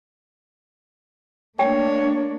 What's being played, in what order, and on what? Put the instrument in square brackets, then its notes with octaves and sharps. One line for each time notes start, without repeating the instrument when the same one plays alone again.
[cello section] A3 A#3 D4 [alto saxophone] C#5 [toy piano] G5